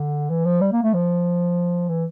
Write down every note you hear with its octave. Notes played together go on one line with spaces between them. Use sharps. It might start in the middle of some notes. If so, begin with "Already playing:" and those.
Already playing: D3
E3
F3
G3
A#3
A3
F3
E3